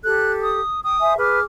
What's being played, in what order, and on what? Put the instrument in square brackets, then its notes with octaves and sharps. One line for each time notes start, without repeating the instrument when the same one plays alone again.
[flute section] G4 A4 [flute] F#6
[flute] D#6
[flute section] G5 [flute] D#6
[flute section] C5 E5 G#5
[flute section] G#4 D6 F6 [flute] B4